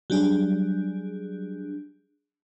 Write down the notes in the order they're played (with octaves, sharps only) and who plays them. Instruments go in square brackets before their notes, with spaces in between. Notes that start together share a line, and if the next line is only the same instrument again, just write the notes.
[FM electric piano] F#3 G3 D4 G#4